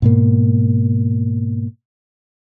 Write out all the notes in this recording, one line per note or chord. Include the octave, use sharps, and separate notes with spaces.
G#2 B2 A#3